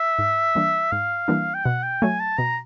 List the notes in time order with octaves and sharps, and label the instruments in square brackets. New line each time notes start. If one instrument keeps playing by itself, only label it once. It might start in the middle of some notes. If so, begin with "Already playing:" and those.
Already playing: [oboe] E5
[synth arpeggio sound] G#2
E3 G3 A#3 D4
[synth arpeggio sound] G#2 [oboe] F5
[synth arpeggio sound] E3 G3 A#3 D4
[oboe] G5
[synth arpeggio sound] B2 [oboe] F#5
[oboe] G5
[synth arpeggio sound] F#3 A3 [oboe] G#5
[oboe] A5
[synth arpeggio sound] B2 [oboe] A#5